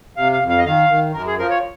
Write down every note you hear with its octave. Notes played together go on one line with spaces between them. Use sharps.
C3 F5
F5
F2
F5
D#5
D#3 F5
D#3
F#2 A#4
G#4
F3 A#4
C#5